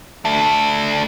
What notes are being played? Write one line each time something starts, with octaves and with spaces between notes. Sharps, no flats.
A3 D4